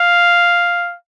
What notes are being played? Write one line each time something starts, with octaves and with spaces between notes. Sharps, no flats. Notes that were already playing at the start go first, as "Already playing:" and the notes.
Already playing: F5